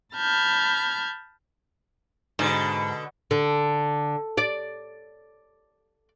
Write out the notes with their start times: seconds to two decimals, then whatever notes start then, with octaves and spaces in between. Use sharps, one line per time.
0.16 A5 B5 F6 G6 G#6
2.39 G#2 B2 D3
3.31 D3
4.38 D5